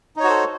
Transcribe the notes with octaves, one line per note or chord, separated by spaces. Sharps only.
D#4 F#4 A4 C5 C#5